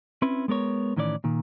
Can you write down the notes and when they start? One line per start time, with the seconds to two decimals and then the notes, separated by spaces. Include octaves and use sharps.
0.22 C4 C#4 E4 B4
0.48 G#3 B3 A#4 C#5
0.96 A2 D#3 E3 C#4 G4 D5
1.24 A#2 D#3